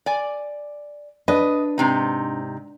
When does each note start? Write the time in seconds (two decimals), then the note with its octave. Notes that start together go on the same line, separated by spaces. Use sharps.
0.06 D5 G#5
1.28 D4 B4 D#5
1.78 G#2 C3 D#4